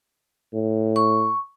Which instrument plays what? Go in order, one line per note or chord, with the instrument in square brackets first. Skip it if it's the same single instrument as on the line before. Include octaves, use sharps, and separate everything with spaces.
[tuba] A2
[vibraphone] C#6